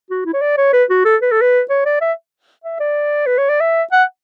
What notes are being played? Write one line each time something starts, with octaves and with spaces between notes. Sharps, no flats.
F#4
E4
C#5
D5
C#5
B4
F#4
A4
B4
A4
B4
C#5
D5
E5
E5
D5
B4
C#5
D5
E5
F#5